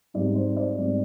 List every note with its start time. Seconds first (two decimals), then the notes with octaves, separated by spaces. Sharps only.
0.14 G#2 G3 C4 D5
0.35 C5
0.57 D5
0.77 G#2 G3 C4